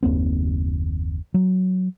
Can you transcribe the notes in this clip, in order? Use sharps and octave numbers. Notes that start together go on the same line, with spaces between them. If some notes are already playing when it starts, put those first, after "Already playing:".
F#1 D#2 A#3 C4
F#3